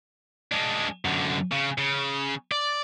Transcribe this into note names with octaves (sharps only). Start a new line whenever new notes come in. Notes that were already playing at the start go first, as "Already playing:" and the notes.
G#3 D4
F#2 D3
C#3
C#3
D5